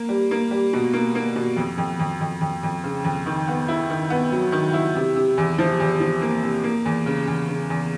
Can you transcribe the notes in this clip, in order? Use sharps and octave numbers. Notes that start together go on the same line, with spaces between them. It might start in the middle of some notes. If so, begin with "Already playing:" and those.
Already playing: A#3
G3
A#3
G3
B2
A#3
A#3
B2
F2
F2
F2
F2
F2
F2
C#3
F2
D#3
B3
E4
D#3
B3
F#3
D#3
E4
C3
C3
E2
F3
E2
F3
A#3
C3
A#3
E2
C#3
E2
C#3
E2